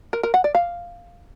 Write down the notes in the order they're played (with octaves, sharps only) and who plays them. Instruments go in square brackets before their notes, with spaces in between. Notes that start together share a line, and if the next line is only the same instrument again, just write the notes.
[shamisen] A#4
A#4
F#5
D5
F5